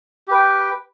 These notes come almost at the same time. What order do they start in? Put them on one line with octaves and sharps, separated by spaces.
G4 B4 G5